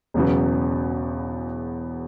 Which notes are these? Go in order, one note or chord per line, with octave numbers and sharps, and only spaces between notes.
E1 E2 C#3 F#3 B3